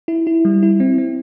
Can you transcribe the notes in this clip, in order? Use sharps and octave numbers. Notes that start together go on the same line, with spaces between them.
E4
E4
G3
E4
C4
C4